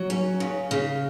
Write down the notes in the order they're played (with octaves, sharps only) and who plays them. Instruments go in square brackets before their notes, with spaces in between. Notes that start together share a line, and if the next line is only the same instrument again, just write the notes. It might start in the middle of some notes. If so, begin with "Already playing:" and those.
Already playing: [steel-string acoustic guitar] F#3
C#4
C#3
C#3